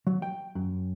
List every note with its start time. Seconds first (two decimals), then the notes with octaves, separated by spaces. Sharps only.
0.07 F#3
0.22 G5
0.55 F#2